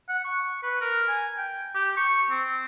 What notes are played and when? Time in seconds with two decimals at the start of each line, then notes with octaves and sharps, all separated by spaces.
0.09 F#5
0.25 C#6
0.63 B4
0.81 A#4
1.08 G#5
1.38 G5
1.75 G4
1.97 C#6
2.31 C4